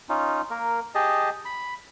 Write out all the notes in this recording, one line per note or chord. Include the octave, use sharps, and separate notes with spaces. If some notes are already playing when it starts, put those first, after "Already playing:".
C#4 D#4 F4
A#3 A#4
G4 G#4 D#5 A5
B5